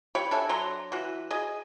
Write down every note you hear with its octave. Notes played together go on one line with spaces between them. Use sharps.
G4 C#5 G5 B5
D4 A4 E5 G#5
F#3 D4 A#5 C6
E3 F#4
G#4 D#5